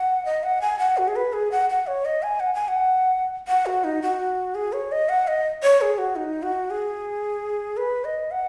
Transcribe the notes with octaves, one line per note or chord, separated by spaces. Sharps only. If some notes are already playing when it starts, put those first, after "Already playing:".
Already playing: F#5
D#5
F#5
G#5
F#5
F#4
G#4
B4
G#4
F#5
F#5
C#5
D#5
G#5
F#5
G#5
F#5
F#5
F#4
D#4
F#4
G#4
C#5
D#5
F#5
D#5
C#5
G#4
F#4
D#4
F#4
G#4
B4
D#5
F#5